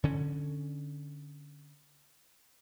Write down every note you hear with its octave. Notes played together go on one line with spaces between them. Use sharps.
D3 C#4